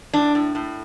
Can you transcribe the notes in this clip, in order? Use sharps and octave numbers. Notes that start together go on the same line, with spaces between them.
A2 D4
A2
A2